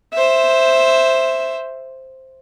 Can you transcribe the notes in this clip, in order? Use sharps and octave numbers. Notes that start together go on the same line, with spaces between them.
C5 E5